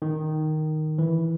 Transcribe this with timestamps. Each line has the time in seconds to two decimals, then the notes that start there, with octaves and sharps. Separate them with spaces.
0.02 D#3
0.98 E3